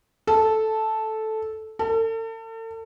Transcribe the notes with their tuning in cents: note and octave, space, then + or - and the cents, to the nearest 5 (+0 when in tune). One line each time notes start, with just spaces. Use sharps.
A4 -5
A4 +40